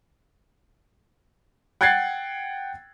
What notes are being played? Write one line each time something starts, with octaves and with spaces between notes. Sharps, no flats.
F#5 G5 F#6 G#6 A6 C7